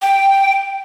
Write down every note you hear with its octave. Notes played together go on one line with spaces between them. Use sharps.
G5